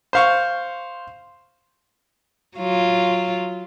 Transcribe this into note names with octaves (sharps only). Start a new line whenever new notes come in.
C5 F5 C#6
F#3 F4